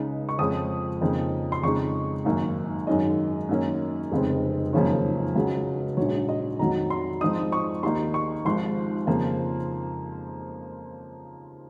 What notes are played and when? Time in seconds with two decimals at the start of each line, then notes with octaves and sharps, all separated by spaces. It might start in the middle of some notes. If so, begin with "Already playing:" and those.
Already playing: C#2 C#3 G#3 D#4
0.29 C#6
0.39 F2 C#3 F3 G#3 C#4 D#6
1.01 F2 C#3 F3 A#3 D#4
1.52 C6
1.63 F2 C#3 G#3 D#4 C#6
2.25 G#1 F#2 D#3 A#3
2.87 G#1 F#2 D#3 G#3 C#4 D#5
3.49 F#2 D#3 A#3 C#4
4.11 F1 F2 C#3 G#3 C4
4.73 G#1 F#2 C#3 F3 A#3 C#5
5.35 C#2 C#3 F#3
5.97 A#1 G#2 F#3 C#5
6.29 D#5
6.59 F2 D#3 F#3 A#5
6.90 C6
7.21 G#2 F3 C4 D#4 D#6
7.52 C#6
7.83 D#2 D#3 A#3 D#4 C6
8.14 C#6
8.45 G#1 G#2 F3 C6
9.07 F2 C#3 F3 A#3